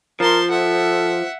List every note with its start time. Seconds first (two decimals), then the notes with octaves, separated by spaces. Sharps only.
0.20 F3 A#4 A5 C6
0.50 A4 E5 F#5